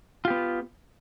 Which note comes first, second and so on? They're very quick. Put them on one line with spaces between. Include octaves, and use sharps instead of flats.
F4 G4 B3